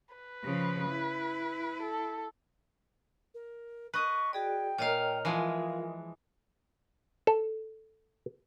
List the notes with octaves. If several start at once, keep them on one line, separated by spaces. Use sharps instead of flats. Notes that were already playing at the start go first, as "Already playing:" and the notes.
B4
C#3 F3
E4
A4
A#4
B4 D#5 C#6
F#4 G#4 D5 G5
A#2 C#5 D#5 F5 A#5
E3 F3 G#3 F4 A#4 F5
A4